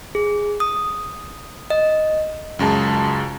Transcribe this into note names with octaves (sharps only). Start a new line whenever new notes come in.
G#4
D#6
D#5
C#2 F#2 G#3 A5